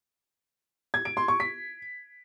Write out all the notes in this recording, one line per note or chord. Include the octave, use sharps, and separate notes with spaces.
G#6
D7
C6
C#6
B6